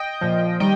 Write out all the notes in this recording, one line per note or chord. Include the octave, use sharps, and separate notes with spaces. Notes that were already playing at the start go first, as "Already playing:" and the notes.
Already playing: D#5 G5
A#2 F3
D#3 G3 D#5 G5